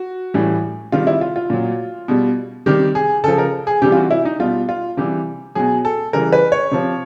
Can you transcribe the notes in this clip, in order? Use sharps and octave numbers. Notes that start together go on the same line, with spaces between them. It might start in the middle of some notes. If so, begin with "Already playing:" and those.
Already playing: F#4
A2 E3 G3
C3 D#3 G3 F4
E4
F4
F4
A#2 F#3
B2 G3
C3 D#3 G3 G4
G#4
C#3 F3 A4
A#4
G#4
C3 E3 G3 G4
F4
F#4
E4
D#4
B2 G3 F4
F4
C3 E3 G3 G4
B2 F#3 G#4
A4
C#3 E3 G3 A#4
B4
C#5
C3 F3